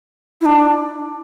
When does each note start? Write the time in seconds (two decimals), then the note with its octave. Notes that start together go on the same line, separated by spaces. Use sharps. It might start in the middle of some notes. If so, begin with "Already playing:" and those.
0.41 E4
0.45 D4